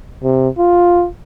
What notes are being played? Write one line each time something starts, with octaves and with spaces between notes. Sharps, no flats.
C3
F4